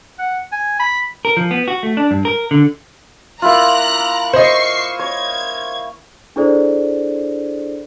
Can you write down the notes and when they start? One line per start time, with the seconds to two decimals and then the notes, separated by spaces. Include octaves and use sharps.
0.19 F#5
0.52 G#5
0.80 B5
1.25 A#4
1.37 F3
1.51 B3
1.68 F#4
1.83 A3
1.97 D4
2.11 G2
2.25 A#4
2.51 D3
3.42 A#3 E4 F4 A#5 F#6
4.33 C5 D#5 C#6 C7
4.99 C#5 G#6
6.36 D4 E4 G#4 A4 C5 D5